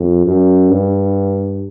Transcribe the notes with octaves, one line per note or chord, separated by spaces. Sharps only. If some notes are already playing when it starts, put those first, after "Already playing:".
Already playing: F2
F#2
G2